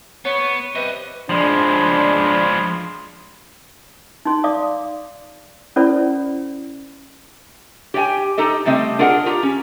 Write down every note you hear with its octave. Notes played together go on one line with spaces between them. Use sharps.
B3 C#5
G3 C4 B4 D#5 E5
F3 G#3 D4 B5 C6
D#4 C6
D5 F5 D6 D#6
C#4 E4 A4 C5 D5 B5
G4 C#5 D5 G5 G#5
D#4 G4 A4 D#5
C3 G3 A3 C4 D#5
D4 F4 G#4 A#4 D#5 F#5
F4 G4 A#5
C#4